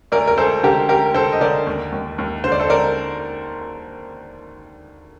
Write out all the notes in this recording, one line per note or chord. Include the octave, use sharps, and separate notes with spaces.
D2 A#4 D5
A#4
D2 A4 C5
D3 G4 A#4
D2 G4 A#4
D3 A4 C5
D#5
D3 A#4 D5
D#2
D#2
D#2
D3 C5
D5
A4 C5
D3 A#4 D5